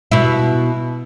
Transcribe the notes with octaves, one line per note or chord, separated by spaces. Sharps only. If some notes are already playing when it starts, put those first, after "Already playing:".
B2 E4